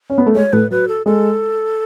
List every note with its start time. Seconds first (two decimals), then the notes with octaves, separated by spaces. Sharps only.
0.10 C#4
0.18 B3
0.26 A3
0.35 G#3 C#5
0.53 A2 A3 B4
0.71 F#3 B4
0.88 A4
1.06 G#3 A4